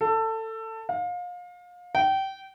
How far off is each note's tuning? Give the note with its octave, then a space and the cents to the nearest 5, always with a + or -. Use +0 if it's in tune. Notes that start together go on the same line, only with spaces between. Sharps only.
A4 +20
F5 +30
G5 -25